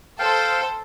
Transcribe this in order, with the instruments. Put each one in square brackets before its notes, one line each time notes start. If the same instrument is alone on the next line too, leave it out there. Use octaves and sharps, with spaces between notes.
[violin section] A4 C5 [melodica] F5 G5